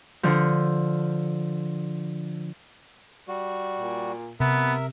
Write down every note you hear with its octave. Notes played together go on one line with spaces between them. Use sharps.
D3 F3
G3 F#4
A#2
C3 B3 A#4 E5